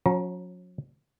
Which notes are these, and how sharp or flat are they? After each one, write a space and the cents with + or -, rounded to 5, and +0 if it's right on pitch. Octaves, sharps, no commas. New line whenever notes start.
F#3 -40 C#4 -5 A#5 +30